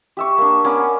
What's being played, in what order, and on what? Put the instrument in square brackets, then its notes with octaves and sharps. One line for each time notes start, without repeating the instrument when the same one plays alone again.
[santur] G4 E5 C#6
A#3 D4
A#3 B3 C#4 D5